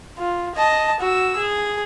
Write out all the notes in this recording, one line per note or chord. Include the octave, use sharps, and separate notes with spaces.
F4
D#5 A5
F#4 E6
G#4